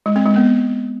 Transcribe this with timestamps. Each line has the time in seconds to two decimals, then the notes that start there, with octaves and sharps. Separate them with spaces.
0.06 G#3
0.16 C4
0.26 G#3
0.36 B3